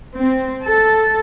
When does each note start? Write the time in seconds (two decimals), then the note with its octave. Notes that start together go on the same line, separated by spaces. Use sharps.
0.17 C4
0.66 A4